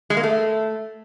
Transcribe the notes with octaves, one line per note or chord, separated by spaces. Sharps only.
G#3
A#3
A3